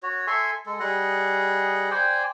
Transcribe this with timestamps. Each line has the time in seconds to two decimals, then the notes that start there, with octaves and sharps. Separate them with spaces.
0.03 F#4 C#5
0.27 A4 E5 G#5 C6
0.66 G#3 A4
0.79 G3 G#4 D#5 F#5
1.91 C5 D5 G5 G#5